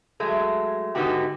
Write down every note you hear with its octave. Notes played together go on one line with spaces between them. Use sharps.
F#3 G#3 A3
G#2 D3 B3 D#4 F#4 G4